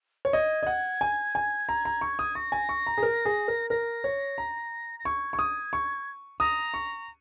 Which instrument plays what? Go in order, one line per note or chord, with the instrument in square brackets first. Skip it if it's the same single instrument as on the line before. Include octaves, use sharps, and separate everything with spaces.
[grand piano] C#5
[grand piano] D#5 [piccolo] G#6
[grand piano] D#5
F#5
G#5
G#5
A#5
A#5
C#6
D#6
[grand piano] C#6 [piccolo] A#6
[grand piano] G#5
C#6
A#5
G#4
A#4
G#4
A#4
[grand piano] A#4 [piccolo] A#6
[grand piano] C#5
A#5
[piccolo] A#6
[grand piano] C#6 [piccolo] G#6
[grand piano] C#6
D#6
C#6
[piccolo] A#5 [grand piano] D#6
[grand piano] C#6